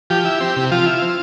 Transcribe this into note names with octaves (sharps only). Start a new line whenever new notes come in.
F3 G4
E4
C4
C3
F3 F4
E4
C4